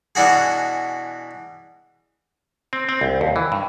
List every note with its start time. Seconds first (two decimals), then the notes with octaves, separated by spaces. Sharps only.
0.15 B2 E3 D4 F#4 G#4
2.73 C4
2.89 C4
3.01 C2
3.21 D#2
3.36 E3
3.52 G2